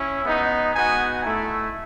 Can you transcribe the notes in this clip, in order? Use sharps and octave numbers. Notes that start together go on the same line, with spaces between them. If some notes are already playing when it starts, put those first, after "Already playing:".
Already playing: C#4 E4
G#3 B3 D#4
B3 D#4 F#4 G#5
A3 E4